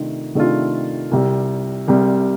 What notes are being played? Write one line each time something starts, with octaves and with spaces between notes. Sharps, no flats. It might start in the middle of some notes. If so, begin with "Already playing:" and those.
Already playing: C3 D#3 A3 D4 F4
C3 D#3 A3 D4 F4
C2 C3 G3
C2 C3 G3